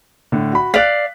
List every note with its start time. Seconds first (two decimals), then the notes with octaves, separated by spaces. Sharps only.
0.32 A2 D3
0.52 F#4 B5
0.74 D5 F5 F#6 B6